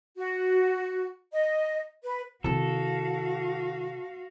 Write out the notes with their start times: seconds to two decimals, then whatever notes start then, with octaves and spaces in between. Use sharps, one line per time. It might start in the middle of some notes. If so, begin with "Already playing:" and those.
0.17 F#4
1.32 D#5
2.03 B4
2.44 C3 D#3 E4 F#4 A4 F5